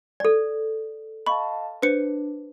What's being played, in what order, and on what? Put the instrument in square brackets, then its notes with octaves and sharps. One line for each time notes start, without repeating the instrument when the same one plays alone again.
[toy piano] A4 D5
[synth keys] D#5 F5 A5 [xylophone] B5 C#6
[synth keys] D4 [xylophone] B4 C5 C#7